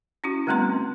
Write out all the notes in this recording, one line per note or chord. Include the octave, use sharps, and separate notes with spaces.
C#4 E4 F#4
D3 G3 A3 B3 C4 C6